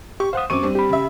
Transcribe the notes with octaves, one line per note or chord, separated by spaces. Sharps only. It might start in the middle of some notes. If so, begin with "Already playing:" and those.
G4 C#6
C5 F5 F#5 D#6
F#2 C4 C#6 D6 D#7
G3 C4 D4
G4 B5
C#3 E5